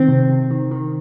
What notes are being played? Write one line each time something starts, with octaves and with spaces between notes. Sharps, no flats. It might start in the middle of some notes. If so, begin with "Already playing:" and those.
Already playing: D#3 C4
C3
C3
D#3
D#3